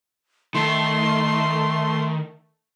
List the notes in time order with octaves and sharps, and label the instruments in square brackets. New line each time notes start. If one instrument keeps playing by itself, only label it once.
[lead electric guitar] D#3 [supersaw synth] A3 [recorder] C6